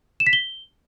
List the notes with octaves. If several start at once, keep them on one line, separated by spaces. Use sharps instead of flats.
E7
B6
G7